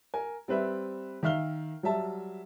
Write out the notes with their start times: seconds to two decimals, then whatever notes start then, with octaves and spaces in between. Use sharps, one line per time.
0.14 A#4 G#5
0.48 G3 C4 B4 E5
1.23 D#3 E5 F5 F6 G7
1.83 F#3 G3 E5 A5